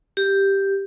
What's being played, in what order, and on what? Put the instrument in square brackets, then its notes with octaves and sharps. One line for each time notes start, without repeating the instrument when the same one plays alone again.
[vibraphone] G4